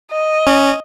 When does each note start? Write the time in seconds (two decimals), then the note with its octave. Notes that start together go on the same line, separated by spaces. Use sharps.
0.12 D#5
0.47 C#4